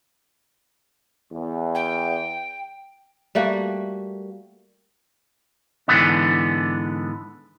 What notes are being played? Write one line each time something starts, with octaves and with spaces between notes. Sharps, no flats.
E2
G5
G3 A3 A#3 F#4
G#2 B2 D3 E3 B3 D4